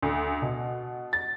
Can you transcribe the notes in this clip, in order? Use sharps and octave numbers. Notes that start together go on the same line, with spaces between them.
D2
B2
A6